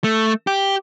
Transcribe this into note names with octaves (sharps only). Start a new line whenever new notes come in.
A3
G4